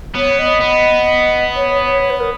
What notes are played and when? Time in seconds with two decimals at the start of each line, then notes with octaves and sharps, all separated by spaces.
0.15 B3 C#5
0.39 D#5
0.61 B3
1.56 C#5
1.71 C#5
1.86 C#5
2.02 C#5
2.10 B4
2.20 A#4